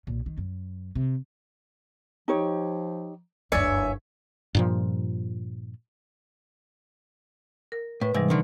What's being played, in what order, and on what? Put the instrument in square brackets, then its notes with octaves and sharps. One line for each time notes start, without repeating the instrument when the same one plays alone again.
[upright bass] B1 A#2
D#3
F#2
C3
[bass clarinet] F3 [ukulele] D#4 G4 C#5
[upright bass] F#1 D2 [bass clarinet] G2 [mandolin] C#5 E5 G#5 [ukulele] D5
[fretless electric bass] G2 A#2 F3
[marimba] A#4
[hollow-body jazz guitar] A2 [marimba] B4
[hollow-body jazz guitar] G#2 [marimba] C3 E3 G3
[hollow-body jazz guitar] D3 D#3